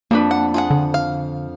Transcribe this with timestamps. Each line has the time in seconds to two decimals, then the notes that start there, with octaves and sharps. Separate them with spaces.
0.11 F2 A#3 D4 B4
0.31 F#5
0.54 F4 G#4 F#5
0.70 D3
0.94 F5